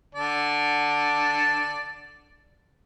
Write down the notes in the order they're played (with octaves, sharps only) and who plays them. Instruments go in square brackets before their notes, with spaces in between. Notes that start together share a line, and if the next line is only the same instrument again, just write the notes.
[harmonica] D3 D5 A5